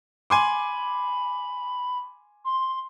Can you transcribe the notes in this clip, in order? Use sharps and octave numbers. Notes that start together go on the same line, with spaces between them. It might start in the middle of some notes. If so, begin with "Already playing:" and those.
G#5 B5 C6 D6
C6